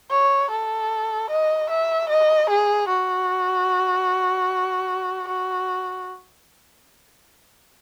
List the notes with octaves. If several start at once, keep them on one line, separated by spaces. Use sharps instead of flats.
C#5
A4
D#5
E5
D#5
G#4
F#4
F#4